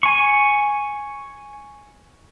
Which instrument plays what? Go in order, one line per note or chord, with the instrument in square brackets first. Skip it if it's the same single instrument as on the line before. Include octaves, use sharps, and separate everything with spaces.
[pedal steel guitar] G#5 C#6